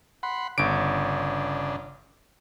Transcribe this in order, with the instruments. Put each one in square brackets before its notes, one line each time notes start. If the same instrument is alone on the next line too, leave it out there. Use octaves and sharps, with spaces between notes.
[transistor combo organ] F#5 B5 C6
[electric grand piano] G1 D7 [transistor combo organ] C#3 D4